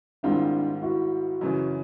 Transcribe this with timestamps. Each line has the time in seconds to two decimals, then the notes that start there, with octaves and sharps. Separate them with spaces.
0.23 G#2 D#3 G3 C4 D4 E4 F4
0.82 E4 F#4
1.41 F#2 C#3 E3